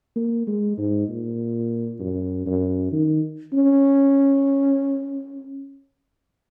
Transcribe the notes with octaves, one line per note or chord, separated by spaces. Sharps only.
A#3
G#3
G#2
A#2
F#2
F#2
D#3
C#4